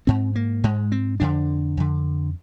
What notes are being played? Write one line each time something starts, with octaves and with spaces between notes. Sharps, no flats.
G#2 C4
A#3
G#2 G#3
C4
F2 D3 D4
F2 D3